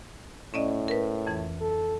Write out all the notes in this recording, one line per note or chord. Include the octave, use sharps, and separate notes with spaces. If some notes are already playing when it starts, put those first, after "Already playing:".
A2 C#4 D5 D#5
A#4 B4
F2 E3
A4